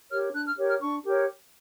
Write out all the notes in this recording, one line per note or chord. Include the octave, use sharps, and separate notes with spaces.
G4 A#4 C#5 F6
D4 F#6
F6
G4 A#4 C#5
F6
D4 C#6
G4 A#4 C#5